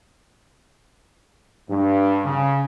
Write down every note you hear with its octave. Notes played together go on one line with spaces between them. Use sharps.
G2
C#3